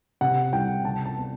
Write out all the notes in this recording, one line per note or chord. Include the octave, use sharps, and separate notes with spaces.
C3 F#5
C2 G5
C3 A5
A5
B3